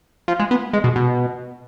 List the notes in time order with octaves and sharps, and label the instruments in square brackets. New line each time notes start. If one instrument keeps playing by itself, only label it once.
[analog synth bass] F3
G#3
B3
G#3
B2
B2